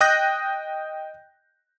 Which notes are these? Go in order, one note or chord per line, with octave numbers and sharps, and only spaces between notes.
D#5 G5 D#6 F#6 G6 A#6